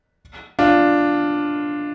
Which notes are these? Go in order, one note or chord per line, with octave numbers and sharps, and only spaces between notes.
D4 F4